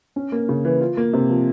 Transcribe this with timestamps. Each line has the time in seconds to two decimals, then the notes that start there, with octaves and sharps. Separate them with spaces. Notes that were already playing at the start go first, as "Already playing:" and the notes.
0.16 C#4
0.32 A#3
0.49 C#3
0.65 E3
0.80 F4
0.97 A#3
1.13 C3
1.29 F3